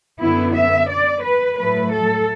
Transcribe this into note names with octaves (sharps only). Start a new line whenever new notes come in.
F#2 D3 B3 E4
E5
D5
B4
A2 F#3 A3 B4
A4